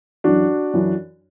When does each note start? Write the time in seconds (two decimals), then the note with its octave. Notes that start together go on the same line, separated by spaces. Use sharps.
0.24 F#2 E3 D4 F#4
0.73 F#2 E3